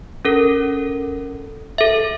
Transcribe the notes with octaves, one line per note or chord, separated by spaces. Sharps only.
C#4 A4 A#4
A4 E5